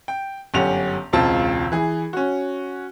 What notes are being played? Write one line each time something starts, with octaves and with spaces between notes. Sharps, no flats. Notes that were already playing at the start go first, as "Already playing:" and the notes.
G5
G1 F#2 C#4 G4 F#5 F7
E1 C#2 C4 F4 A5
E3 G#4
C#4 F#4